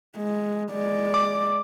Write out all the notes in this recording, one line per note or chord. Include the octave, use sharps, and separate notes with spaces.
G#3
G#3 D5
D6